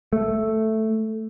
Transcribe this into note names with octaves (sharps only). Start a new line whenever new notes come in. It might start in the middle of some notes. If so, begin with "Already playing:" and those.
A3